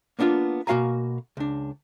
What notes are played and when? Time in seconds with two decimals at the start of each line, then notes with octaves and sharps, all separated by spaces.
0.19 A#3 B3 D4 D#4 F4
0.67 B2 A#3 F#4 F5 G#5 A#5
1.37 C#2 D4